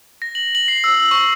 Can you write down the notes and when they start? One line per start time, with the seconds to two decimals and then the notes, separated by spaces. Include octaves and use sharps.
0.22 A#6
0.35 F#7
0.55 F#7
0.68 C7
0.84 E6
1.11 C#6